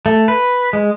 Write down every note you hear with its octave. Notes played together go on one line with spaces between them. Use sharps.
A3
B4
G#3